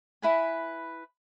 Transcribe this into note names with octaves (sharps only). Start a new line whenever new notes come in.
E4 B4 G#5